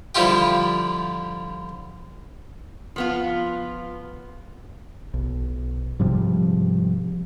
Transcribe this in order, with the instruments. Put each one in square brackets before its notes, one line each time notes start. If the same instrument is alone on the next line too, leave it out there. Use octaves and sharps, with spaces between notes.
[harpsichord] D3 F3 G3 E4 F4 G4
[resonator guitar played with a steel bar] F3 B3 F4
[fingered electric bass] B1
G#2 C3 F3 G3